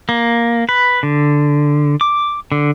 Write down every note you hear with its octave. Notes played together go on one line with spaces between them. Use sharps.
A#3
B4
D3
D6
D3